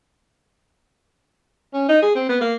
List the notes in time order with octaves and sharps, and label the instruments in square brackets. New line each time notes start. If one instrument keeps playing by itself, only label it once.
[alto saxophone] C#4
D#4
G#4
C4
B3
A#3